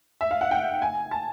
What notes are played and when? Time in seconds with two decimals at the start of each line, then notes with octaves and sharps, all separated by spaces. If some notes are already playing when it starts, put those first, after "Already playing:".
0.21 E5
0.31 F5
0.41 F#5
0.51 G5
0.82 G#5
1.11 A5